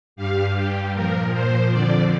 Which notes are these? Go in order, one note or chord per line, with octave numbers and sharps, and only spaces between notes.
G2 G3 F5
G4
A#2 F3 A#4
C5
F2 D3 F3 D5